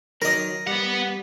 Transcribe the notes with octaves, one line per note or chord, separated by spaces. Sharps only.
D#3 F#3 A#4 D#5
G3 B3 F#5